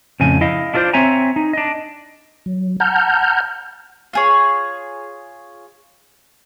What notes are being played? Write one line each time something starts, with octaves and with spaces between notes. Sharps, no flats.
F2 A2 C#3 G#5
E4 D#5 F5
D4 F4 A4 A#4 C5 D5
C4 C#5 E5 G#5 A#5
D#4
D4 D#5
F#3
F#5 A5 A#5 F6 G6
F4 G#4 C#5